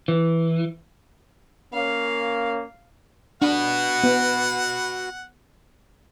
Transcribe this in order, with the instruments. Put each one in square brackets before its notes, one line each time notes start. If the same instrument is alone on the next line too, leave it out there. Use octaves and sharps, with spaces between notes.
[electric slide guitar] E3
[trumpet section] A#3 C#4 [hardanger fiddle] F5
[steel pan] D4 [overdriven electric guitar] F#4 B4 [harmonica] F#5
[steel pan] B3